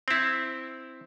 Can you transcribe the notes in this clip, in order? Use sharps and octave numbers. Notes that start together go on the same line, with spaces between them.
C4 E4